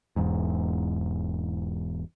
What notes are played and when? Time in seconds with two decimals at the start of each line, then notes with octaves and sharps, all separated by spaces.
0.16 E1 E2 G#2